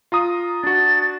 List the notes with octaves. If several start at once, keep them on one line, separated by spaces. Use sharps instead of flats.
F4 A#5 D#6
D4 F#4 A6